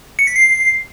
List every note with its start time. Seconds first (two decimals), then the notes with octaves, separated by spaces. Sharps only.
0.19 C#7
0.27 B6
0.36 C7